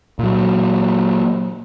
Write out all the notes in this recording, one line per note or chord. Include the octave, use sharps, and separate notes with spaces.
A#2 F#3